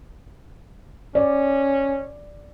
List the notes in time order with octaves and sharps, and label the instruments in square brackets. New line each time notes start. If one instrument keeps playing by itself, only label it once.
[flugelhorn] C#4 [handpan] D5